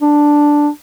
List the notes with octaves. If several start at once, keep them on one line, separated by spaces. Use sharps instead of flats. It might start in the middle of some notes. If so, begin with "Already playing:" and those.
D4